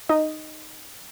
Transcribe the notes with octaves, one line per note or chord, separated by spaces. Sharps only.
D#4 D#5